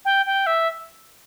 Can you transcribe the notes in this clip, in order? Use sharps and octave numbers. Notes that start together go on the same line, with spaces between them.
G5
G5
E5